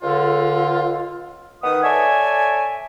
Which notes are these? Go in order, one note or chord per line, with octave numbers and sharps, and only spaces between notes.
C#2 D3 F4
D#3 B3 B4 D#6
A4 C#5 D5 E5 G#5